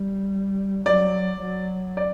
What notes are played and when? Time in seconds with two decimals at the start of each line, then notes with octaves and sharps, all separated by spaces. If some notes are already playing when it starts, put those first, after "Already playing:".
Already playing: G3
0.85 F#3 D5
1.41 F#3
1.97 D5